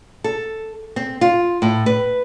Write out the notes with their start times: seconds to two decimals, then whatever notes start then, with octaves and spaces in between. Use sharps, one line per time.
0.24 A4
0.96 C4
1.21 F4
1.62 A2
1.86 B4